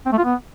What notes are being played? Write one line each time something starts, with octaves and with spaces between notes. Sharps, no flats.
C4
A3
F4
B3